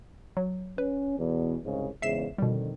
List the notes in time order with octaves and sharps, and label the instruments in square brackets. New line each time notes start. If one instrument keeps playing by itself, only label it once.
[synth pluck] F#3
[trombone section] C#4 [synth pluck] B4
[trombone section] E2 B2
C2 G#2 C#3
[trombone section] E2 G#2 C#3 [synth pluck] E5 C7 E7
[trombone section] F2 D3 D#3 [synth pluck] B2 G3